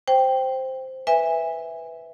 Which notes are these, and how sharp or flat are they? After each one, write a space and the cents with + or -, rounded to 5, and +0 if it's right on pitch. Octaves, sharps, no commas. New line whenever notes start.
C5 +0 G5 +0
B4 +0 E5 +0 G#5 -25